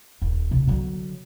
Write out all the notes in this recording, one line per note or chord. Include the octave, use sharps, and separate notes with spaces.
D#1
C3
D3 F#3